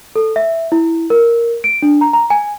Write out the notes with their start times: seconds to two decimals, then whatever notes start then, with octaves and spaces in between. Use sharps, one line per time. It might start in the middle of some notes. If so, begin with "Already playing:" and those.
0.16 A4
0.36 E5
0.72 E4
1.10 A#4
1.64 D7
1.82 D4
2.01 A#5
2.13 A#5
2.30 G#5